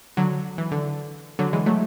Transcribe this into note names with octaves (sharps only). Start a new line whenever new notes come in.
D3 F#3
E3
D3
D3 F#3
E3 G#3
F#3 A3